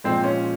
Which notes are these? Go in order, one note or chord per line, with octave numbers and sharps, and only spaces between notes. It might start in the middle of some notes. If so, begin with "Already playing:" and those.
A#2 F3 G#3 C4
C#4